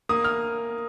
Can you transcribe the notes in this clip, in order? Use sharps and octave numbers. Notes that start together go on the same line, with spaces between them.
A#3 D#6
F6